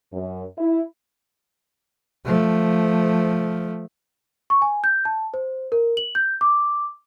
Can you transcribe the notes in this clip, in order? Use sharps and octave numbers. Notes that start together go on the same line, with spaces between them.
F#2
E4
F3 A3
C#6
G#5
G6
A5
C5
A#4
F#7
G6
D6